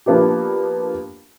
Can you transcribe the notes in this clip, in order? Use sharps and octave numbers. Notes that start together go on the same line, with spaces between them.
F3 A#3 B3 D4 G4